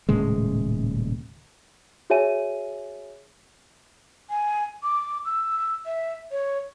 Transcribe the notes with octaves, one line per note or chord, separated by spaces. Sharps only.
D#1 A2 C#3 G#3
F#4 G#4 C#5 E5 G#5 D#7
G#5
D6
E6
E5
C#5